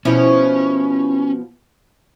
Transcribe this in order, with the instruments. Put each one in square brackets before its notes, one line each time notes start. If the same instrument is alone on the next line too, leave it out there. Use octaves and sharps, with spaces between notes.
[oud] B2 F3 E4 [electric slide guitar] C#4